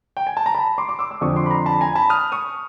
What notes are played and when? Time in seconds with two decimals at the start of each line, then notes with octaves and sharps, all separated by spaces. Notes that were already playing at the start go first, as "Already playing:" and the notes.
0.17 G5
0.27 G#5
0.37 A5
0.46 A#5
0.55 A5 B5
0.78 C6 D6
0.89 C6 D6
0.99 D6 E6
1.11 D6 E6
1.21 F2 D3 F3 C#6 D#6
1.36 C6 D6
1.46 B5
1.51 A#5 C6
1.66 A5 B5
1.81 G#5 A#5
1.95 A5 B5
2.10 D#6 F6
2.32 C#6 D#6